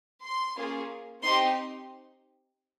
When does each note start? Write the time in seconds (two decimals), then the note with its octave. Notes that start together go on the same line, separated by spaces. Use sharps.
0.23 C6
0.57 A#3 C#4 F4 G#4
1.23 C4 D#4 G4 C6